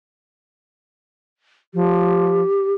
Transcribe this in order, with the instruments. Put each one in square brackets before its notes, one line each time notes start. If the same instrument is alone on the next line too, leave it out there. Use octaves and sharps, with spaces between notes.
[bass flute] F3 [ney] G4